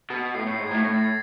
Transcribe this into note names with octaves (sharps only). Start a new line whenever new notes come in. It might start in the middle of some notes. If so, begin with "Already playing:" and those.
B2
A2 C7
A2 C7
G#2
A2 G#6
A2 A#6
A6
G#6